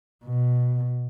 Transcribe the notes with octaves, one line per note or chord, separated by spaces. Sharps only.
B2